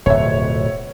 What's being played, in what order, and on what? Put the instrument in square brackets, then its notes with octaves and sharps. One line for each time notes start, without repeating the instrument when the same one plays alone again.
[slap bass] D1 F2 B2 [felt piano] C#5 E5